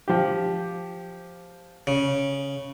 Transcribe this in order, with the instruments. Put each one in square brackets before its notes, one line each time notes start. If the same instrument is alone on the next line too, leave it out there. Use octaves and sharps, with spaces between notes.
[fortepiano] F3 G4
[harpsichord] C#3